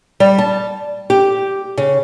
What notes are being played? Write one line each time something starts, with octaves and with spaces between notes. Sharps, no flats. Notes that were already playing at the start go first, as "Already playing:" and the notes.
G3
A5
G4
C#3